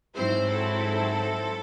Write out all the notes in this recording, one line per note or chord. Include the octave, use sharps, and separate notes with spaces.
G#2 F#3 C4 E4 C5
A4